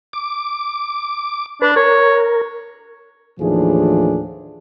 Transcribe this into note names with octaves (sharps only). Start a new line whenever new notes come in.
D6
D4 B4
A#4 C#5
D#2 A2 E3 F3 D4 G#4